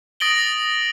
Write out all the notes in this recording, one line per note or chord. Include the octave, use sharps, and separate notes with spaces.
D#6 A6 A#6 D7 F#7 G7